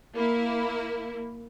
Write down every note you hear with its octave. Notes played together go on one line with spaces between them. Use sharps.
A#3 E4